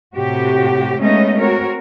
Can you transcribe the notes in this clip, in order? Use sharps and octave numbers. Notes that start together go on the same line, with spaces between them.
A2 C3 F#4 G4
G#3 A3 B3 C#4 D#4 D#5
C4 F#4 A#4 C#5